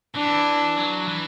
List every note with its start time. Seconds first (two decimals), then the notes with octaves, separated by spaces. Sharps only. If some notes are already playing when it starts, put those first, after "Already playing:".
0.15 E3 D4
0.77 F#3
1.08 E3